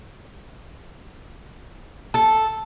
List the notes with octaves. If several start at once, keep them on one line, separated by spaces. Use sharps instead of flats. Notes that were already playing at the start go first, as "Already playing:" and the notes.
A4